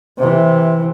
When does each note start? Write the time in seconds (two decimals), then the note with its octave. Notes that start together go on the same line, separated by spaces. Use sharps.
0.18 C3 E3